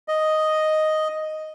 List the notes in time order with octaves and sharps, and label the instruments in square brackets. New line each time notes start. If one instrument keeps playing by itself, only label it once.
[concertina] D#5